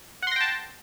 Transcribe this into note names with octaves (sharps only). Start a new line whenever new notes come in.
F#5 G5 A5 C6 A#6